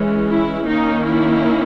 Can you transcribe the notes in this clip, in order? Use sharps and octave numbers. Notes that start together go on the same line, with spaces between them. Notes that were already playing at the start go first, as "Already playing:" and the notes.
Already playing: E3 G#3 C#4
E4
D#3 A#3 C#4 D#4
E4